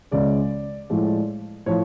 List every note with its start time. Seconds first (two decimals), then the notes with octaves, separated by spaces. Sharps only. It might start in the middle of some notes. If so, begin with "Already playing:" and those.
0.11 C#2 C#3 G#3 D5
0.90 A2 F3 G#3
1.66 A2 F3 C#5